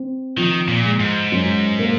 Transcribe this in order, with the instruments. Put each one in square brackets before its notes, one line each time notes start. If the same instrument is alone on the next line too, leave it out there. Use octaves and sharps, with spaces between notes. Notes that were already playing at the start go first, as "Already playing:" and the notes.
Already playing: [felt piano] C4
[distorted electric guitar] D#3 [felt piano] F3
[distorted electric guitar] A#2
[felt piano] G#3
[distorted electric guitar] G#2
[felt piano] F#2
A#3